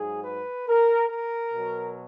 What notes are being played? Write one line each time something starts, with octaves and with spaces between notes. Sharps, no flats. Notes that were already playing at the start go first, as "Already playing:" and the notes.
Already playing: G#2 F#3 G#4
B4
A#4
A#4
B2 F#3